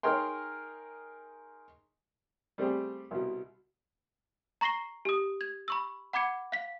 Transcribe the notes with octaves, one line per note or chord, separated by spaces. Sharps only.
D#4 G#4 A#4 C#5 G5 C6
G3 A3 C4 G4 G#4
C2 B2
A#5 C#6 A#6 C7 G7
G4 D#6
G#6
B5 C#6 E6
F#5 B5 D6 G#6 C#7
F5 B6